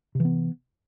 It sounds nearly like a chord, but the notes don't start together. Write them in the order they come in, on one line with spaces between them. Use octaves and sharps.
C3 E3 B3